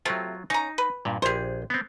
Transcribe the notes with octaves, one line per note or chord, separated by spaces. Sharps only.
C3 F#3 A3 C4 F4
C#4 D#4 A#5
B4
G2 A#2
A#1 G4 G#4 C5
B3 C4